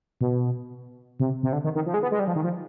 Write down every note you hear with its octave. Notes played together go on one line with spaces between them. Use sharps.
B2
C3
C3
D3
D#3
D#3
F3
G#3
B3
G#3
G3
F3
D#3
F3